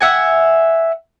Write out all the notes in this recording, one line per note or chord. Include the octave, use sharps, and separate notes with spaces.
E5 F#5 G#5